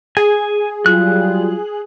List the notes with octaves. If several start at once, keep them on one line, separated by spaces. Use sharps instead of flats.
G#4 G#5
F#3 G3 F4 F#6